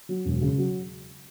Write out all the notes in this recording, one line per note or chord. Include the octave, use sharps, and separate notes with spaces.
F#3
E1
C#3
F#3